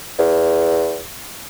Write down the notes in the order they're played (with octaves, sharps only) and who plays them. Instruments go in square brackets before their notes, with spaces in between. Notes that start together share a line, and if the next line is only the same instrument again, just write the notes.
[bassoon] E2